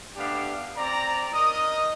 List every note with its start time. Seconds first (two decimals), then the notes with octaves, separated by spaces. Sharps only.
0.16 A3 B3 D4 G4 D5 F5
0.75 C4 D5 A#5
1.32 D#4 A#4 D#5 D#6